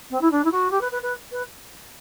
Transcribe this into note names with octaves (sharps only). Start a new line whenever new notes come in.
C4
E4
D4
E4
F#4
G4
B4
B4
B4
B4